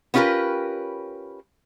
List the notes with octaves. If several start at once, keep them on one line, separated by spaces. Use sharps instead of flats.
B3 C#4 F4 G4 A#4 B4